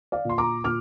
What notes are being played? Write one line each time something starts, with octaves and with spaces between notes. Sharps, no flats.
D5 F5
A#2 C6
A#5 D6
A#2 D6 F6